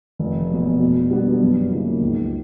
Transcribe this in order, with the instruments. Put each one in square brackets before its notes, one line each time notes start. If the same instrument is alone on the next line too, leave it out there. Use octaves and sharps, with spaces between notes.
[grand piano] F1
E2 B2 F#3
B2
G3 B3 D4
F#2
C#3 F3 A#3 D#4
C#2